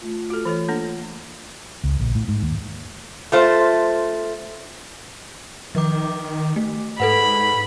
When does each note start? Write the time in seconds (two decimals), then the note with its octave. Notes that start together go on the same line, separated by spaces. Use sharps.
0.02 A3 F4
0.30 F#4 A4
0.45 E3 A4 C#5
0.69 A#3 D4 A4
1.84 C#2
2.00 A#1
2.15 A2
2.28 G#2
2.42 D#2
3.32 A3 F4 C5
5.75 D#3 F3 D6
6.56 A3
7.00 G#2 A4 B4 F#5 B5